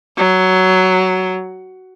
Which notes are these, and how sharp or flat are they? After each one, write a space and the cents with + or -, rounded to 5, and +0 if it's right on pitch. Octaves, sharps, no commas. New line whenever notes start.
F#3 +10